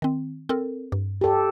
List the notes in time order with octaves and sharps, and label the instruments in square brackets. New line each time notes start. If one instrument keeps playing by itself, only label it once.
[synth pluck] D#3 C4
C4 A4 A#4
G2
[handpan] G4 A4